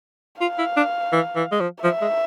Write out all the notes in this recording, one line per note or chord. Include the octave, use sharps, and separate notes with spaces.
F4 F5
E4
D4
E3
E3
G#3
F3
F3 E5
G#3